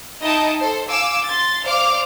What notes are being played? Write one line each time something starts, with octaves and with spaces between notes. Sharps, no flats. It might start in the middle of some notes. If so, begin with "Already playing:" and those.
D#4 E4 D#5 G5 A5
A4 C5
F5 G#5 D6 E6
C6 A6
C5 D5 F5 D6 F6